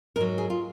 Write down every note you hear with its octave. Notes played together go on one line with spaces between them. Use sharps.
G#2 F#3 A#4
G#4
F4